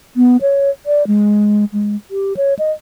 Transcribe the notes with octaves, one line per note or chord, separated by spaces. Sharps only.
B3
C#5
D5
G#3
G#3
G4
C#5
D#5